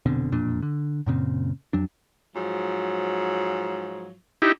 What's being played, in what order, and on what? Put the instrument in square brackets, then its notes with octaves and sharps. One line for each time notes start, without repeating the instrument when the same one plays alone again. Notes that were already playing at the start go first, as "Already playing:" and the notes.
[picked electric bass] F1 B2 D3 C4
E1 F2 A#2 D4
D3
F#2 A#2 C#3 C4
F2 F#3 D4
[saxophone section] G#2 F3 F#3
[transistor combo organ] D#4 E4 G4